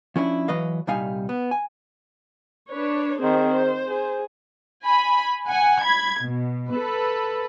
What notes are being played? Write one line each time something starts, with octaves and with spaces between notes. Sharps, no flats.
F3 C#4 D4 E4
E3 F#3 B4 D#5 F5
C2 A#2 G3 D#4 F5 G#5
B3
G#5
D4 B4 C#5
D#3 C4 G#4 C5
C5
G#4
G#5 B5
F#5 G#5
B5 G#6
B2
A4 B4